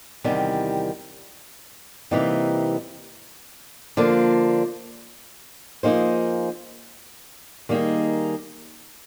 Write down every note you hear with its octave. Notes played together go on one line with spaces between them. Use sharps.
E2 C3 D#3 G3
C3 E3 G3 A#3 D#4
D3 F3 A#3 D4 F4
F3 A#3 D#4 G#4 C5
D#3 G3 A#3 D#4 G#4